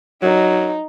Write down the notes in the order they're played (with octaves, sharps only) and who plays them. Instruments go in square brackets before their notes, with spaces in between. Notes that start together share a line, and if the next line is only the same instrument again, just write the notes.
[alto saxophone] F#3 [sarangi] D#4